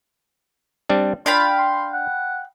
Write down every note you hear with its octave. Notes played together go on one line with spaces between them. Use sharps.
G3 C4 D4
D4 F4 F5 G5 B5
C6
F#5